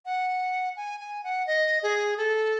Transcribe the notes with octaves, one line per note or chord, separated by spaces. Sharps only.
F#5
G#5
G#5
F#5
D#5
G#4
A4